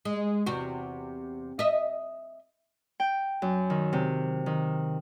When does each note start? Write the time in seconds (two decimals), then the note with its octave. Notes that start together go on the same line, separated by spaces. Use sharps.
0.05 G#3
0.46 E2 C3 F#4
1.59 D#5 E5
3.00 G5
3.42 F#2
3.70 D#3
3.93 C3
4.46 D#3